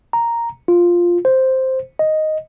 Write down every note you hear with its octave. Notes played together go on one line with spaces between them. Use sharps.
A#5
F4
C5
D#5